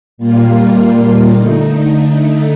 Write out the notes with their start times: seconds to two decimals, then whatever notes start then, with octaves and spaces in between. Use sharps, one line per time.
0.18 A#2 G3 A#3 F4
1.31 D3 A3 D#4